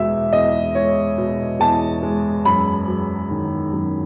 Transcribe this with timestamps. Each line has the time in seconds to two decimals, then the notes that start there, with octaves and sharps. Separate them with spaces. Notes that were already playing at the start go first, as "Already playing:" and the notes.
Already playing: E2 B2 G#3 E5
0.32 E2 D#5
0.75 G#3 C#5
1.18 B2
1.60 E2 A5
2.03 G#3
2.45 F#2 B5
2.87 F#3
3.31 D#3
3.73 F#2